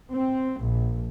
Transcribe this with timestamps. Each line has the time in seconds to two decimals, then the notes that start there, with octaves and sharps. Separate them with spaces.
0.13 C4
0.62 A#1